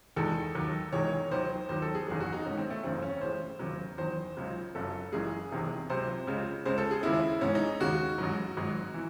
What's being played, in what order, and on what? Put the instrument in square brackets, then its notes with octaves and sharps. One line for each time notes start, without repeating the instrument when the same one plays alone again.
[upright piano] E2 D#3 G#3 A4
D#2 D#3 F#3
E1 E2 D#3 G#3 C#5
D#2 D#3 F#3 C5
D#2 D#3 F#3 C5
A4
G#4
F#1 E2 D#3 F#3 G#4
F#4
D#4
A1 G#2 D#3 G#3 C#4
C4
A3
F#1 E2 C#3 F#3 C4
C#4
A1 A2 G#3 C5
E1 D#2 C#3 F#3
E2 D#3 F#3 C5
C#2 C#3 F#3
F#1 F#2 C#3 F#3 A4
F#1 F#2 E3 G#3 G#4
E1 E2 C3 D#3
C#2 C3 F#3 C5
C#2 C#3 G#3
C#2 C#3 G#3 C5
A4
G#4
D#2 C#3 G#3 E4
A1 G#2 E3 G#3 C#4
D#4
D#2 C#3 G#3 F#4
A1 G#2 F#3
G#1 G#2 F#3
E3